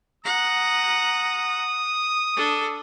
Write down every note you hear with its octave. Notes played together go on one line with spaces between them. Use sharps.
F#5 A#5 D#6
D4 A4